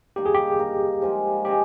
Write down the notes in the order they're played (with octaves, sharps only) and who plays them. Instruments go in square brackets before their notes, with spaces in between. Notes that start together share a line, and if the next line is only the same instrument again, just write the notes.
[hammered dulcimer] D#3 G3 A#3 D4 [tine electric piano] G4
[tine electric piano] G#4
G4
[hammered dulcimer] A#3 D#4 A#4
F3 G#3 D#4 A#4
[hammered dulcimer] G#3 D4 G#4 D#5 [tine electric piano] G4